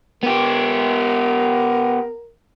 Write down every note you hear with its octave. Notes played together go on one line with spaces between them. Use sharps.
B3 G4 A#4